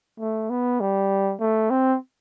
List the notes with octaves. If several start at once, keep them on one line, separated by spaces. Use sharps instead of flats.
A3
B3
G3
A3
C4